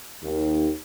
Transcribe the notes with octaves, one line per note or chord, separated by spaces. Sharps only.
D#2